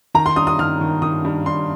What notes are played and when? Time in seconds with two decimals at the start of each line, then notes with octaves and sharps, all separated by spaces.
0.15 D#3 A#5
0.26 C6
0.36 G2 D#6
0.47 D#6
0.59 D#3 F6
0.81 D#3
1.02 D#3 D#6
1.25 G2
1.46 G2 C6